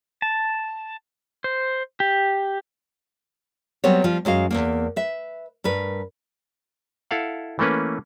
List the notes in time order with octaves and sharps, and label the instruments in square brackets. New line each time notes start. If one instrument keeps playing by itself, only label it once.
[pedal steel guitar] A5
C5
G4
[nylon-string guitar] F#3 G3 B3 C4 C#5
F3 G3 F4
F#2 G#3 F#4 F5
E2 G2 A#3
B4 E5
G2 A#4 B4
[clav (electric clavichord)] E4 A4 F5 F#5
E3 A3 A#3 C#4 B4